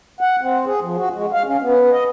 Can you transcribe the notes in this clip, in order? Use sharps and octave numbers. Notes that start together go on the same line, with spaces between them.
F#5
C4
G#4
F3
F#4
G#3
F5
C#4
B3
D#5